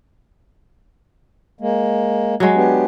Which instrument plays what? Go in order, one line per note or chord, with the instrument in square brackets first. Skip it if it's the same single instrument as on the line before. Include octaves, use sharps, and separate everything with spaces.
[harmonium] G#3 A#3
[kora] F#3 G#3
[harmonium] B3 D4 G4